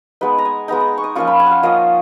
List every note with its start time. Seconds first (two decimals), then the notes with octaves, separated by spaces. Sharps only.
0.21 G#3 B3 D#4 B4
0.38 A#5
0.45 G#5
0.68 G#3 B3 D#4 A#5
0.80 A#5
0.98 C#6
1.04 D#6
1.16 F3 A#3 C#4 F4 C#6
1.27 B5
1.40 G#5
1.46 F5 F#5
1.63 F3 A#3 C#4 F4 D#5